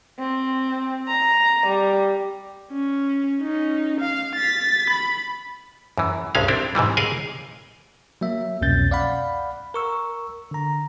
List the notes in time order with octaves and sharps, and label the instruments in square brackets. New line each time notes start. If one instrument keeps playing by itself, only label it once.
[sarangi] C4
A#5
G3
[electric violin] C#4
C#4 D#4
F5
A6 B6
B5
[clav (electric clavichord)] F#2 E3
C2 G2 G#3 C#4 F5
C4 D4 E4
G#2 C3 E3 G3
G#4 A#4 C#5 D#5 F5 G#5
[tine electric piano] F#3 A#3 E5
C2 F2 B2 C#4 G6 A6
D5 F5 F#5 B5
A#4 C#6 E6
D3 A#5